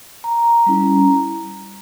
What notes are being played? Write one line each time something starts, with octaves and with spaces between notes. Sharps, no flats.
A#5
G3 C#4 E4